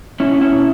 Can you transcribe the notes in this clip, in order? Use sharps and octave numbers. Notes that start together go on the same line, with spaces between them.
B2 C#4 E4
C#4 E4
B2